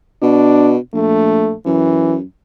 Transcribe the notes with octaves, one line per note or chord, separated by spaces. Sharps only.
B2 D4
A#1 A3
F#2 E3